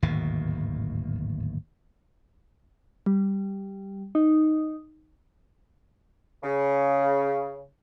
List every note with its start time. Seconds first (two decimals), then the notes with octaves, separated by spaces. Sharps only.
0.02 D1 G#1 D#2 B2
3.06 G3
4.15 D#4
6.43 C#3